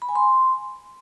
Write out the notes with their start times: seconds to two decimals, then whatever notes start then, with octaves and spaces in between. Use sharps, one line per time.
0.02 B5
0.09 G#5
0.16 C6